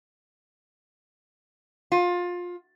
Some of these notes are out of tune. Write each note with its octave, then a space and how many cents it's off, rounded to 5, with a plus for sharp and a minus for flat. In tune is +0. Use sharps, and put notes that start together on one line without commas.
F4 +20